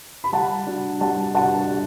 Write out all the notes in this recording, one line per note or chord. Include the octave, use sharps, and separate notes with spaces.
B5
G3 F#5 A5
D4 F#4
G3 F#5 A5
D4 F#4 F#5 A5
G3